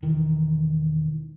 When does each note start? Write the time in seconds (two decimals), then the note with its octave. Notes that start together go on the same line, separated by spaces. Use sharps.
0.02 E1 D#3 E3